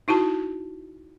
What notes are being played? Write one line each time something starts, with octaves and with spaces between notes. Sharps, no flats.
D#4 E4 F#4 A5